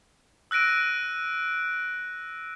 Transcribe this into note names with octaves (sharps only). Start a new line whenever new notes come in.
E6 F#6 A#6 D7 D#7